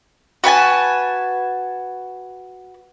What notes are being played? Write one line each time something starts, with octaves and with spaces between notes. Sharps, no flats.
F#4 B4 G#5 A5